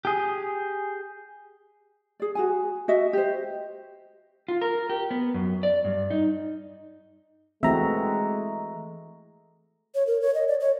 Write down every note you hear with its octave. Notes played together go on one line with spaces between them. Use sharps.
G4 G#4
G#4 D5
F#4 G#4 G#5
F#4 D#5 E5
G4 C5
F4
A#4
G4
B3
F#2
D5
G2
D#4
E3 G#3 A3 C4 F#4 E5 A#5
C#5
A#4
C#5
D#5
D5
C#5